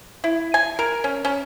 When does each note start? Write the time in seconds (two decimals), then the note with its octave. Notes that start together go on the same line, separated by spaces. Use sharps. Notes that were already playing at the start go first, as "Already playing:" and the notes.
0.24 E4
0.54 G#5
0.79 A#4
1.04 C#4
1.25 C#4